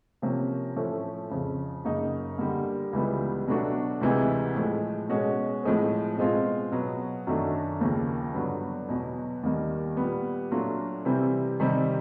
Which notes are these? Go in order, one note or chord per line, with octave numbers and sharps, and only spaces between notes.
C3 F3 A#3 C#4
A2 F3 A3 C#4
F2 C#3 F3
F#2 C#3 F#3 A#3 D#4
D3 G3 A#3
C#2 C#3 E3 G3 B3
B2 F#3 A3 D4 F#4
D2 C3 E3 G#3
A2 F3 G#3
B2 G#3 C#4 F#4
A2 F3 G#3 C4
B2 G#3 C4 F4
B2 F#3 B3
F#2 D#3 F#3 A3 D4
D#2 C#3 F3 A#3
G2 D3 F#3 B3
E2 B2 F#3
D#2 D#3 G3 A#3
A#2 G3 B3
A#2 F#3 A3 D4 F4
C3 E3 G3 C4
C3 D#3 G3 C4